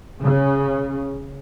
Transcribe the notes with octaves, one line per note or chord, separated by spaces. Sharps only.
C#3